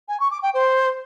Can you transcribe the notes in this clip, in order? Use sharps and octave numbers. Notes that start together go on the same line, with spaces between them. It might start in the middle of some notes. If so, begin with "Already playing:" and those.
G#5
C#6
D6
G5
C5